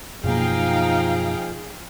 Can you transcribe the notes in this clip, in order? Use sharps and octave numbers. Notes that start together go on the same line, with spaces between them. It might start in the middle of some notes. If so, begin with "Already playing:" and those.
F#2 B2 F3 A#3 D#4 G#4 F5 G5